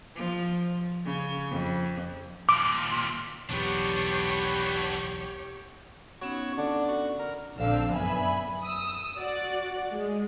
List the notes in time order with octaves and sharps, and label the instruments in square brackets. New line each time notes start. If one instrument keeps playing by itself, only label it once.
[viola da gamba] F3
C#3
F2
[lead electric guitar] D#2 A#2 [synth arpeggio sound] D6 D7
[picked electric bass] B1 E2 [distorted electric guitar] B3 D4 [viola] G4 C#5
[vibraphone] B3 C#4 D#4 [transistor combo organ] F#4 C#5
[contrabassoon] D3 [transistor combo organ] D4
[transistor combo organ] F#4
A#4
[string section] A#1 D3 C4 D4 F5 E6
F#2 B3 E5 G#5 B5
D#6 E6
F#4 D5 F#5
G#3